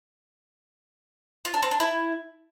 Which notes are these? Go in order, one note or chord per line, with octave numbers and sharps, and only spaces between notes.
F4
D4
C4
D4
E4